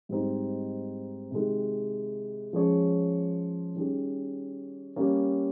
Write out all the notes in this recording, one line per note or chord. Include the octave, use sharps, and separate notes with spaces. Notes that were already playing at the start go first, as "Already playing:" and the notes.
G#2 G3 C4 D#4
C3 D#3 G#3
F3 G#3 C#4 G#4 C#5
D#3 G3 C#4 G#4
G3 A#3 C#4